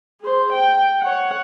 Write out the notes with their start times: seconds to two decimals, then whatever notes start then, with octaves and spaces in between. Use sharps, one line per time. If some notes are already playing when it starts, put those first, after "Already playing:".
0.21 G#4 C5
0.53 G5
1.01 C#5 F#5